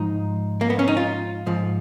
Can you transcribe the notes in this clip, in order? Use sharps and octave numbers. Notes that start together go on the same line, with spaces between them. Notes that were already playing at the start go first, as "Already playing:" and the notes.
Already playing: G#2 F3 D#4
A#3
B3
C#4
D#4
F4
G#2 F3